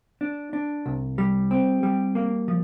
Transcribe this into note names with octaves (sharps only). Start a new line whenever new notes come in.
D4
D4
C2
G3
C4
G3
A#3
F3